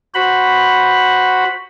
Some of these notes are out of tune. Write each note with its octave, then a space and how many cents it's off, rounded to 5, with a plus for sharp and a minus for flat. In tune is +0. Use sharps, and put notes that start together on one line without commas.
F#4 +0 C5 +0 B5 +0